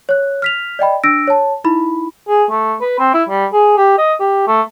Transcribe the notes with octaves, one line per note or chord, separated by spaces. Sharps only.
C#5 F#6
F6 B6 F7
D5 D#5 G5 B5
D4 E6 A#6 D7
C#5 A5
D#4 E4 B5
G#4
A3
B4
C4
E4
G3
G#4
G4
D#5
G4
A3